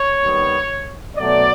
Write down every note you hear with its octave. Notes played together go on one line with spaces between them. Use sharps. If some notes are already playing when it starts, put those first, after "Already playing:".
Already playing: C#5
D#2 D#3 G3 B3
B2 F#3 A3 D5